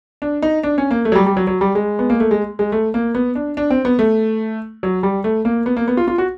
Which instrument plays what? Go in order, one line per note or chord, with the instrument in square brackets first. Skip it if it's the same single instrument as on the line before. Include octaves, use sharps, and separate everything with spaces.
[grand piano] D4
D#4
D4
C#4
A#3
A3
F#3
G3
G3
F#3
F#3
G3
G#3
B3
A#3
A3
G#3
G#3
A3
A#3
B3
D4
D4
C4
B3
A3
F#3
G3
A3
A#3
B3
A#3
B3
F4
F4
F#4